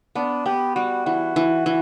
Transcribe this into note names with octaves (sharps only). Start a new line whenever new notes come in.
B3 D4
B3 G4
G3 F#4
E3 F#4
E3
E3